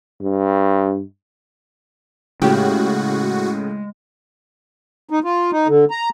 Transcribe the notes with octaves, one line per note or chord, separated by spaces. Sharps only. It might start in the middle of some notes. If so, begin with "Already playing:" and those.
G2
A2 C#3 G#3 F#4 G4
D#4
F4
D#4
D3
A#5